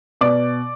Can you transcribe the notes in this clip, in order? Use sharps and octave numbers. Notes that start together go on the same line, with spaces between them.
B2 D5 D6